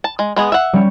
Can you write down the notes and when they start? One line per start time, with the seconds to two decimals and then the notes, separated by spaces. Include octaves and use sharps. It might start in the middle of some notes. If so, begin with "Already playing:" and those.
0.04 A5
0.19 G#3
0.36 G#3 B3 G#4
0.52 E5 F#5
0.73 G3 C#4